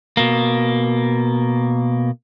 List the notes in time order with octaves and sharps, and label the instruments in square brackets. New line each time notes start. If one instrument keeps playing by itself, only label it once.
[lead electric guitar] B2 A#3